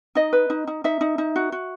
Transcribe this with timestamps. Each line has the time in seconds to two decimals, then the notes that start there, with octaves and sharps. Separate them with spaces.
0.15 D#4 D#5
0.33 B4
0.50 D#4
0.67 D#4
0.84 D#4 E5
1.01 D#4
1.18 D#4
1.36 F#4
1.52 F#4